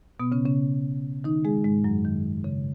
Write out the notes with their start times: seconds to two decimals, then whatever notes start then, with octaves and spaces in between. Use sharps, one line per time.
0.20 B2 B3
0.32 C#3 C#4
0.46 C#3 C#4
1.24 D#3 D#4
1.45 G#3 G#4
1.64 G#2 G#3
1.84 F#2 F#3
2.04 D#3
2.44 C#3